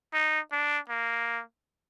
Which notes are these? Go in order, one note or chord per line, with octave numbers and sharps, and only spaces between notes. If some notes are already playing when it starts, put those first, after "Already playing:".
D#4
D4
A#3